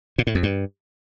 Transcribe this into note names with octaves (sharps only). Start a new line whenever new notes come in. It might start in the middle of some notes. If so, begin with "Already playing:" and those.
A#2
A2
F2
G2